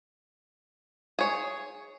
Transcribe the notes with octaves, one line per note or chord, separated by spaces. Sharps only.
G#4 C#5